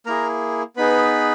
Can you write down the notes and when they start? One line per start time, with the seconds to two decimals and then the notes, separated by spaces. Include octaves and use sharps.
0.06 A#3 E4 G#4 A#4 A#5
0.77 B3 D#4 G#4 B4 B5